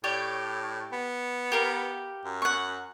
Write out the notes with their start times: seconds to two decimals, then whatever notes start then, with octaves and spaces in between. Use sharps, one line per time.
0.04 A2 G4 C#5 D5
0.92 B3
1.52 G4 A#4 F5
2.25 F#2
2.42 F#5 C#6